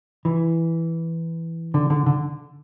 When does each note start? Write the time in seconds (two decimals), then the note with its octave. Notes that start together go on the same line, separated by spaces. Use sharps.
0.25 E3
1.74 D3
1.90 D3
2.06 D3